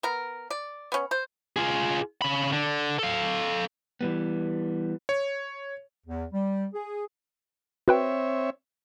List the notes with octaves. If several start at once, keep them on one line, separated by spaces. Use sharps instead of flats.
B3 A#4
D5
B3 C#4
C5
F4 G#4
C#3 B5
D3
A4 F5
E3 G3 B3
C#5
E2
G3
G#4
C4 F#4 B4 C#5 E5 G5